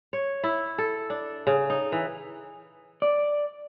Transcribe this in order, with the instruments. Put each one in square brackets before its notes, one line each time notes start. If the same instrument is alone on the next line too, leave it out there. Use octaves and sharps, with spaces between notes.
[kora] C#5
E4
A4
D4
C#3
D#4
E3
[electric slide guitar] D5